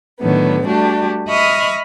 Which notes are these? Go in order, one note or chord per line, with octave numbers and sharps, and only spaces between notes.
A2 D3 D#3 F#3 B3
G3 A3 D4 F#4 G4
D#5 E5 B5 C#6 D#6 F6